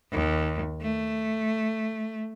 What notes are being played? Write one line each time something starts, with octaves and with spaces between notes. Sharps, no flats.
D#2
A3